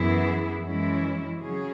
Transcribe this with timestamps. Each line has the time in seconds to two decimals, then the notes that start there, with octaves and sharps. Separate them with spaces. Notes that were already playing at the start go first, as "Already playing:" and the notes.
Already playing: F#2 E3 B3 E4 G#4
0.65 F#2 E3 G#3 C#4 E4
1.40 C#3 F#3 C#4 G#4